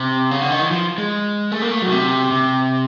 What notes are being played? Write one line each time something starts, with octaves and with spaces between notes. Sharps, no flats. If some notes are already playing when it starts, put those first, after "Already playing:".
Already playing: C3
C#3
D3
D#3
E3
F3
G#3
A3
A#3
A3
B2 F#3
C3
C3